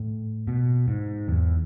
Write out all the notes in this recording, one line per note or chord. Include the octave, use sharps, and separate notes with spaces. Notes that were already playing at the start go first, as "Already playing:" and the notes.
Already playing: A2
B2
G#2
E2